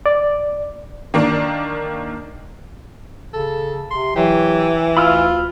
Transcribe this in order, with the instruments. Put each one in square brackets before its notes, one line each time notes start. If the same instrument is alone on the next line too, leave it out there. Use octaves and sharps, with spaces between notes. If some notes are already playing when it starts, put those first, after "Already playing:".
[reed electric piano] D5
[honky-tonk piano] D#3 A#3 D4
[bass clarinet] C#3 [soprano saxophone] A4
[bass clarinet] C3 [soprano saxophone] C6
[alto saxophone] E3 [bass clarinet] F#3 [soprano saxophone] G4
[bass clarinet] D2 [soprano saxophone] F4 [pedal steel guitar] B5 E6 F6